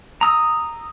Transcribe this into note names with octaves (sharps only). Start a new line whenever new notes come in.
A#5 D#6 E6